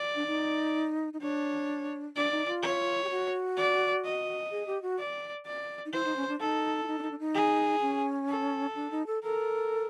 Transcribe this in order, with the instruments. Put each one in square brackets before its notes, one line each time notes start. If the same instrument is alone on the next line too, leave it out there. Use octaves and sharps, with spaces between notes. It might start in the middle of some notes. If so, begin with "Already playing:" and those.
Already playing: [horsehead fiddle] D5
[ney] D4
D#4
D#4
[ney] D4 [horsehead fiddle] C#5
[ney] D4 [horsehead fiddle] D5
[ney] D#4
F4
[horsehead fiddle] C#5
[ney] G4
F#4
[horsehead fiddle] D5
D#5
[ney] G#4
G4
F#4
[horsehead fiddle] D5
D5
[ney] D#4
[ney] E4 [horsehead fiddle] C5
[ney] D#4
C#4
D4
[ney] D#4 [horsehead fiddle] A4
[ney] E4
D#4
D4
D#4
D4
D#4
[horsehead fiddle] G#4
[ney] C#4
[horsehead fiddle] A4
[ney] D4
D#4
A4
[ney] A4 [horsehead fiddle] A#4